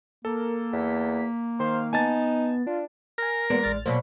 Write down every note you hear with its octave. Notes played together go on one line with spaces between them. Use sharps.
A#3 A4 A#4
E2 B6
D#3 C5 F5
B3 D#4 G#5 A5 A6
D4 F4
A#4 G#5 F6
E2 G#3 A#3 B3 D5
A1 F6 A6
B2 F#3 A#3 C5 D5 B5